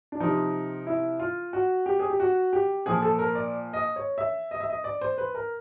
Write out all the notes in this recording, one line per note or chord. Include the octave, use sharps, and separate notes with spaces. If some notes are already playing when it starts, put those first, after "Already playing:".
D4
C3 F3 D#4
E4
F4
F#4
G4
G#4
G4
F#4
G4
A#2 F3 G#4
A4
A#4
D5
D#5
C#5
E5
D#5
E5
D#5
D5
C5
B4
A#4